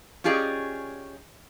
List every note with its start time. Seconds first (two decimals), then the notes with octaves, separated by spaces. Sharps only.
0.24 C#4 F4 G4 G#4 D5 D#5